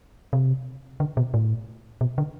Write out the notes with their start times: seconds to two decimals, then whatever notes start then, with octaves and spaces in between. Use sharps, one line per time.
0.33 C3
1.00 D3
1.17 B2
1.34 A2
2.01 B2
2.18 D3